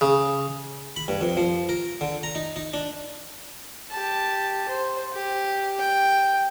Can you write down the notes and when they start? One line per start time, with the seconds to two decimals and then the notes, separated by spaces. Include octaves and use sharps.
0.01 C#3
0.96 B5
1.08 G2
1.21 F2
1.37 F3
1.69 A#4
2.01 D3
2.23 A#5
2.35 D#4
2.56 D#4
2.74 D4
3.91 G4 A5
4.68 C5
5.13 G4
5.79 G5